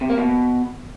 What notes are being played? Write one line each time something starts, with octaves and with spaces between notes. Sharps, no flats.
C3
A#3
B2